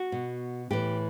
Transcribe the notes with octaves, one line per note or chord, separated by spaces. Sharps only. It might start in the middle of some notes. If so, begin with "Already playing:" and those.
Already playing: F#4
B2
A2 E3 G4